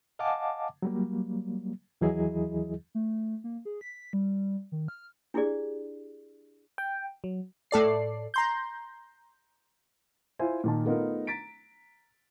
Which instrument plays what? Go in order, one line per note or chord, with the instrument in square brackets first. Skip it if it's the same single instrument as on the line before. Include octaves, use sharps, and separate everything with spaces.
[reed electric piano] D#5 F5 F#5 G#5 A5 D6
F#3 G3 A#3
D#2 E3 F#3 E4 G#4 D#5
[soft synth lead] A3
A#3
G#4
B6
G3
D#3
F6
[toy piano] D4 E4 G4 G#4 D5
[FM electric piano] G5
F#3
[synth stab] A2 A4 D5 C7
A#5 C6 G6
[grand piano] E4 F4 C5 E5 G#5
A#2 D#3 A5
A3 B3 D#4 F4 A#4
A#5 A6 B6 D7